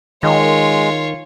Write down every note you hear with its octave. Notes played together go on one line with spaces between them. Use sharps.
D#3 G#3 F4 C#5